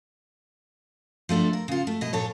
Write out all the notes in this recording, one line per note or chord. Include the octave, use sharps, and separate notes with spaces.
F3 A3 D4 F#4
A#4
C#3 F4
A3
B2 D#5
A#2 A4 C#5